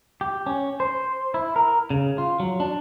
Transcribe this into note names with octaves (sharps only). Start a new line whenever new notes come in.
G4
C#4
C5
E4
A#4
C#3
F4
F#3
D4